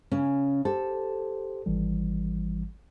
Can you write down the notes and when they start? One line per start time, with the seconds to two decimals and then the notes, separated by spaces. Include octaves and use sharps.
0.11 C#3 C#4
0.65 G4 A4 C5
1.66 G#1 E3 G3